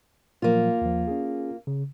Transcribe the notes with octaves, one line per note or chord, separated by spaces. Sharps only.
A#2 F3 F#3 A#3 F4
D#2 F3
C#4 G#4
C#3